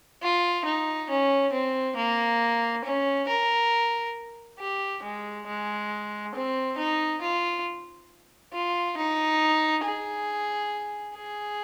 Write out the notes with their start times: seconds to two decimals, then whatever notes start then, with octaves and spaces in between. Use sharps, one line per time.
0.22 F4
0.65 D#4
1.10 C#4
1.52 C4
1.96 A#3
2.85 C#4
3.28 A#4
4.59 G4
5.03 G#3
5.47 G#3
6.35 C4
6.78 D#4
7.22 F4
8.53 F4
8.97 D#4
9.84 G#4
11.15 G#4